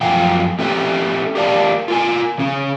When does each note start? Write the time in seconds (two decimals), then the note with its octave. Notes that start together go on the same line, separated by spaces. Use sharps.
0.01 F#2 F3 F5 G5 G#5
0.59 C4 C#4 G4 A4 E5 G5
1.35 G4 A#4 D5 F5 A5
1.88 F4 A#4 G#5
2.38 C#3 C#4